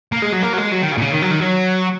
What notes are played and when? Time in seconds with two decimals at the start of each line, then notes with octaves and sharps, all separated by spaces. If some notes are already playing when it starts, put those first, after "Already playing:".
0.12 A#3
0.22 G#3
0.32 F#3
0.42 A#3
0.53 F#3
0.57 G#3
0.72 F#3
0.82 D#3
0.92 C#3
0.97 A#2
1.02 C#3
1.12 D#3
1.22 F#3
1.31 D#3
1.41 F#3